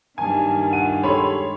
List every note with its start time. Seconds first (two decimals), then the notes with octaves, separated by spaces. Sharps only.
0.18 F#1 G2 D#3 A#3 G#5 A5
0.72 F4 G4 F#5 D#7
1.03 G#3 A4 C#5 B5 C6